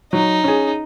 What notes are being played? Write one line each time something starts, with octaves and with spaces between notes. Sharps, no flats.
F#3 D#4
C#4 G#4